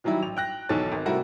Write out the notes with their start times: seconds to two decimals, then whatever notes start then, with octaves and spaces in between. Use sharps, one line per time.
0.04 D#3 E3 F#3 G3 E4
0.22 A1 F7
0.37 G5 F#6 A#6
0.69 B1 E2 D#3 A4 C#5 A6
0.92 G#1
1.06 C3 G3 A3 E4 F#4 A#4